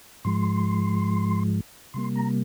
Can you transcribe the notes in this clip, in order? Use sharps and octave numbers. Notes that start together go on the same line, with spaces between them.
G#2 F3 G#3 C6
C3 G3 A#3 C6
A#5